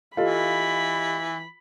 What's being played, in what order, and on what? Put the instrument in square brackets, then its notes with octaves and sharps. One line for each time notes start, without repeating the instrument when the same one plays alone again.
[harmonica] E3 [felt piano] F4 A4 [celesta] G4 D#5 F5 [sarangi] B5